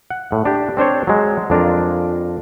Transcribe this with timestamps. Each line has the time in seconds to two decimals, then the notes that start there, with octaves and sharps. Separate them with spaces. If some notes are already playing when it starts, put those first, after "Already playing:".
0.10 F#5
0.32 A2
0.45 D4 G4
0.77 C4 D4 C5 C#5
1.07 F#3 G#3
1.50 F2 D4 F4 A#4